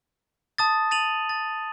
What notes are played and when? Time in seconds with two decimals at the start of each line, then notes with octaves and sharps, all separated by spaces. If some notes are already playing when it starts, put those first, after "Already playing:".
0.58 A5 D#6 A6
0.91 A6 D#7 F7 F#7
1.29 A6